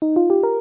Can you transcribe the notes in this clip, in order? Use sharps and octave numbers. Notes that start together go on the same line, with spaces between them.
D#4
F4
G4
A#4